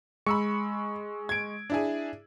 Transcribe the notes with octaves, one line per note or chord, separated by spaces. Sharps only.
G#3 B5 C#6 E6 C#7
G#6 D7
D4 E4 G#4